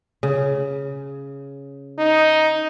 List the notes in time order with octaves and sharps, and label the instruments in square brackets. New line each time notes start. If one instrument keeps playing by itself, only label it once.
[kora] C#3
[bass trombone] D#4